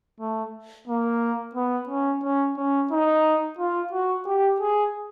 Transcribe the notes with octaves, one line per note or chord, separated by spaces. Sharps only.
A3
A#3
B3
C#4
C#4
C#4
D#4
F4
F#4
G4
G#4